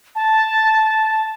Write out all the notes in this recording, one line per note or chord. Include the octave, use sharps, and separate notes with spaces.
A5